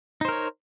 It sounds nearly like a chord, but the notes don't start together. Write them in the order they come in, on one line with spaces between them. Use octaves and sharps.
D#4 C5 A#4 C#5